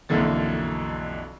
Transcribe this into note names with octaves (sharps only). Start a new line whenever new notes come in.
B1 F2 D3 E3 A#3 A6